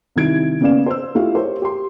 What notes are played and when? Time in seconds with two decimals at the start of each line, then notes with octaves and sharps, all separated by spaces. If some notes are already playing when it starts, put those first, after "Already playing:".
0.16 C2 D#3 E4 G#6 D7
0.61 C#3 A#3 B3 D5 F5 E7
0.86 C5 E6
1.15 A3 E4 F4 G4 A4 F5
1.35 G4 A#4 C5 C#5
1.62 G4 C6